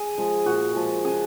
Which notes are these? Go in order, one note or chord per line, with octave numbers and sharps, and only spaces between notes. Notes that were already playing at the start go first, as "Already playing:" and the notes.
Already playing: G#4
F3 G#3
A#2 F#4
F3 G#3
C#3 G#4